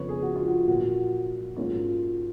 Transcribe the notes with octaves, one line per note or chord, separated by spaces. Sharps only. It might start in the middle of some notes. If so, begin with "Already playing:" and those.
Already playing: F2 C#3 F3 B3 B4 C#5
G#4
F#4
F4
F#4
A#2 F#3 A#3 F#4
G#2 F#3 A#3 C#4 F4